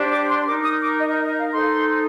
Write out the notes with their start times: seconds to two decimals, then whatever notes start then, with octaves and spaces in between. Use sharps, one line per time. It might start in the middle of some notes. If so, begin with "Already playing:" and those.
Already playing: D4 G4 C5
0.11 D6
0.29 C6
0.46 D#4 A#4 D6
0.64 D#6
0.82 D6
1.00 D#5
1.13 D#5
1.26 D#5
1.39 F5
1.53 D#4 A4 C5 C6